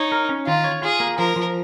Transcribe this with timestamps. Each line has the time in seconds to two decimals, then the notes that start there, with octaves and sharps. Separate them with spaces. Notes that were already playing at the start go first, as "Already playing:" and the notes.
Already playing: D#4 C#5
0.12 A#4
0.29 C#4
0.47 D#3 F4
0.64 C#5
0.82 F4 G#4
1.00 A#3
1.18 F3 A#4
1.36 F3